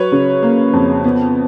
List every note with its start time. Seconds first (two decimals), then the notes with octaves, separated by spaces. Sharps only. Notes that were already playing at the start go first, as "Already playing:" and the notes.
Already playing: F#3 B4 C#5
0.12 C#3
0.43 A#3
0.73 F2
1.04 B3